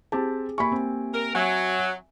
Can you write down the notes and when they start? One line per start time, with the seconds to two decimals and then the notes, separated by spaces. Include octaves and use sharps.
0.12 C4 G4 G#4 A5
0.58 A#3 G4 G#5 B5 C#6
0.72 C4
1.14 A#4
1.35 F#3 E5 G#5